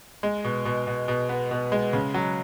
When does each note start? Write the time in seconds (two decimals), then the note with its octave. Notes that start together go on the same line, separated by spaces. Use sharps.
0.23 G#3
0.44 B2
0.65 B2
0.87 B2
1.08 B2
1.29 B3
1.51 B2
1.72 G#3
1.93 C#3
2.14 F#3